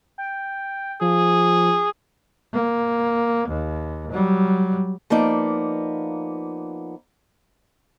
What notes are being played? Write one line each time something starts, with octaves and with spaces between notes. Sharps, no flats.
G5
F3 G#4
A#3
D#2
F#3 G3
F3 A#3 B3 D#4 D5